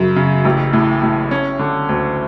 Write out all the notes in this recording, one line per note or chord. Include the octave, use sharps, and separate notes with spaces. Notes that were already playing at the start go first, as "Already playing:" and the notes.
Already playing: F#2 C#3
C#3
A1
A2
A2
C#4
D3
D2